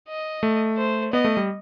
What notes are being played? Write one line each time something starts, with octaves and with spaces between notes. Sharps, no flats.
D#5
A3
C5
B3 D#5
A3
G3